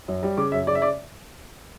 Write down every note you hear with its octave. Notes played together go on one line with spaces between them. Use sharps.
F#2
G3
C#3 D6
F#2 E5
C#3 D5
E5
D5